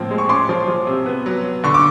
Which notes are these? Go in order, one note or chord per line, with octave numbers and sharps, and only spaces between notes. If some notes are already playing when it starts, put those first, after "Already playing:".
Already playing: A2 F3 A#3 C4
G#3
C#6
C#4 C6 D6
F3
F3
C3
B3
F#3
F#3
D3 C#6
D6